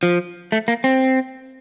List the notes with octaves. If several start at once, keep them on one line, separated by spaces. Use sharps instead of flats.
F3
A3
A#3
C4